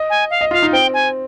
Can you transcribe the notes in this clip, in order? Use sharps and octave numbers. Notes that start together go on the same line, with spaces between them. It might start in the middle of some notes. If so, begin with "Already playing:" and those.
Already playing: D#5
G#5
F5
D#5
F4 F5
D#4
C4 G5
G#5